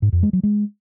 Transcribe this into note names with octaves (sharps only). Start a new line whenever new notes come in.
G#2
F2
G#3
F#3
G#3